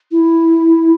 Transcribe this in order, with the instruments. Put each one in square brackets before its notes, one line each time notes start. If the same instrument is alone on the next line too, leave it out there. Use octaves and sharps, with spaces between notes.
[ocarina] E4